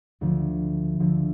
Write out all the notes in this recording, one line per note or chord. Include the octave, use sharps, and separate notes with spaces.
D2 D3 F3
D2 D3 F3